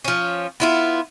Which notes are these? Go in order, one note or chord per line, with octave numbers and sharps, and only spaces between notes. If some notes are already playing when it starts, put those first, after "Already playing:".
F3 C#4
B3 E4 F4